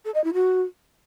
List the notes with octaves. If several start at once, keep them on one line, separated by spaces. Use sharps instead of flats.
A4
D#5
E4
F#4